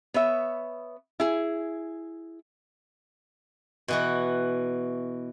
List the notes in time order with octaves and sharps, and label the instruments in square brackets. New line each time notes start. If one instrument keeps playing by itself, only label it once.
[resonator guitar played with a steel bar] B3 C#5 E5
E4 G#4
[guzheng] B2 E3 F#4